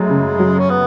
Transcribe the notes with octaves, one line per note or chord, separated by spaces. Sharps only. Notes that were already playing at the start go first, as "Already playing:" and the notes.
Already playing: F#2 G#3 A3
C#3
F#3
C#4
B3